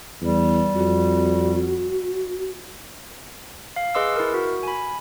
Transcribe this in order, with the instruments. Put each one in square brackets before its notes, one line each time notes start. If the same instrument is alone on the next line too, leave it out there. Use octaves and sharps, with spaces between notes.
[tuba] E2 [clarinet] G3
[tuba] F2 [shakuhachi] F#4
[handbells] F5
G#4 B4 D#5 C6 D6 E6
E4 A#4
F#4
G#5 B5